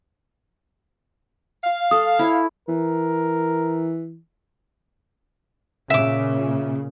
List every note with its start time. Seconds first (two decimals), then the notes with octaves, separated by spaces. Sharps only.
1.63 F5
1.91 A4 D#6
2.19 E4 C#5
2.69 E3 A#4
5.90 A#2 C#3 E5 D6